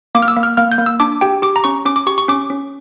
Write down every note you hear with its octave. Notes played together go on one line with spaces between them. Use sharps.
A#3 D6
F6
E6
A#3
F6
A#3 F6
G6
A#3
E6
D4 D6
G4 G5
G4 D6
A#5
C#4 C#6
C#4 D6
D6
G4 C#6
C#6
C#4 D6
C#4